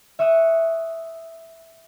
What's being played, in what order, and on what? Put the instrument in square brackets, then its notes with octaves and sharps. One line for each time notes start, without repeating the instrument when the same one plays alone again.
[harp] E5 C#6 D#6 F#6